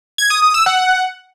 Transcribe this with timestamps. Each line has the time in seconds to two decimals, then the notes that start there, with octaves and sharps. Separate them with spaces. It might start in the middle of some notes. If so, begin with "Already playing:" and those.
0.18 G#6
0.30 D#6
0.42 D#6
0.54 E6
0.66 F#5